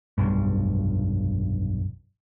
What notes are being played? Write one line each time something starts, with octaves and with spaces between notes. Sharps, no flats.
F1 B1 G2